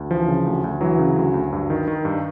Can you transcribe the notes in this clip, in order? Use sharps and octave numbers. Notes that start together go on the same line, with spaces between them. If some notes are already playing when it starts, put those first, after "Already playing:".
Already playing: D2
E3 F3
C#3
D2
D2
E3 F#3
C#3
D2
D2
G2
D#3
D#3
G2